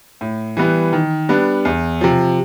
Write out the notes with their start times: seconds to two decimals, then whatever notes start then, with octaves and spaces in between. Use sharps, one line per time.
0.21 A2
0.57 E3 G3 B3
0.93 D#3
1.29 G3 B3 D4
1.65 E2
2.01 C3 F3